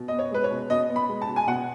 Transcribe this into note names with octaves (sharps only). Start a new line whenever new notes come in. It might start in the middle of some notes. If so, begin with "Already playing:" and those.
Already playing: B2
B3 D#5
C#5
G#3 B4
C#5
B2
B2 D#5
B3
B5
G#3
A5
B2
G#5
B2 F#5